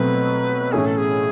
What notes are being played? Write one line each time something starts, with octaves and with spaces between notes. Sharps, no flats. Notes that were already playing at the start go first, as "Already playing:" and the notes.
Already playing: B2 F#3 A3 C4 B4
A2 E3 A3 C#4 G#4
A4
G#4